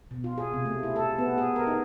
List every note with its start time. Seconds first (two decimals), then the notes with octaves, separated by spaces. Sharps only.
0.11 B2
0.24 F4
0.38 G#4
0.54 C3
0.65 A3
0.83 E4
0.96 A4
1.19 B3
1.38 G#4
1.56 A#4
1.67 D#4